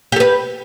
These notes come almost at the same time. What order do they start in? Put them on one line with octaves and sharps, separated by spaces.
G4 A4 B4